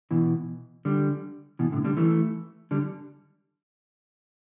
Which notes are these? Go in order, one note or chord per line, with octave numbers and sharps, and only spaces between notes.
B2 E3
D3 G3
B2 E3
A2 D3
D3 G3
E3 A3
D3 G3